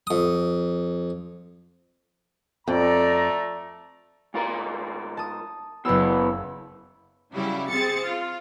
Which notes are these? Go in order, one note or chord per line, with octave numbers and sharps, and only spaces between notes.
F2 D#6
F2 A3 D5 A#5
G#2 F4 A#4
A5 D#6
F#1 B2 E3 B3 E6
C#3 F#3 G3 E4
C4 G#4 A6 C#7
F4